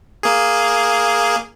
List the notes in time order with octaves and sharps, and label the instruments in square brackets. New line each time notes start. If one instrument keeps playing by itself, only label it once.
[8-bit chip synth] A#3 G#4